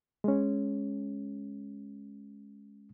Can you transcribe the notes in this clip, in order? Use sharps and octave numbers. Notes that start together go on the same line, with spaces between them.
G#3 C#4